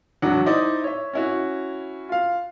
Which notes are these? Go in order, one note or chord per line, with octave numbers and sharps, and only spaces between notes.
E1 F#3 D4 F#4 F#5
D#4 E4 C5 D5 D#5
C#5 E5
C#4 E4 F#4
F4 F5